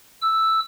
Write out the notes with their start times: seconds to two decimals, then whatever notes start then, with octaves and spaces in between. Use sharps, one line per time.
0.22 E6